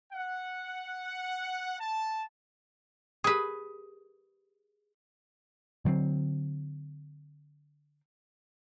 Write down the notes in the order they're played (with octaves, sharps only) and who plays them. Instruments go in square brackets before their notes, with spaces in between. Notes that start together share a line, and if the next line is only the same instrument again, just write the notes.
[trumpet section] F#5
A5
[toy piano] G4 A#4 D#6 [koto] G#4 B4
[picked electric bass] D3 F#3 A3 C4